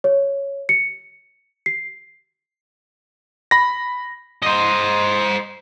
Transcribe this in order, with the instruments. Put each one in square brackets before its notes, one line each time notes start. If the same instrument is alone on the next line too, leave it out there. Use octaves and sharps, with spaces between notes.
[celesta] C#5
C#7
C7
[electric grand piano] B5 A#6
[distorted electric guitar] C5 D#5